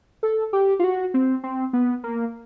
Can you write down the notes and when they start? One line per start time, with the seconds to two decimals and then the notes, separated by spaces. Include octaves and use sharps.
0.23 A4
0.53 G4
0.79 F4
0.84 F#4
1.14 C4
1.43 C4
1.73 B3
2.04 A#3